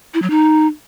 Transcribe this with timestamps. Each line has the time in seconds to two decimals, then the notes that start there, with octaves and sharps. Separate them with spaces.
0.14 E4
0.22 F#3
0.30 D#4